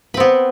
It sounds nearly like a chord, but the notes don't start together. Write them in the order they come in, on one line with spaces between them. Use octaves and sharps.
B4 C4 B3